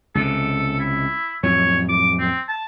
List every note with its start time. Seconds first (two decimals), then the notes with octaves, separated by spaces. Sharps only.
0.15 C#2 C3 A4
0.79 E4
1.43 F2 A2 F#3 C#5
1.89 D6
2.19 C4
2.49 A5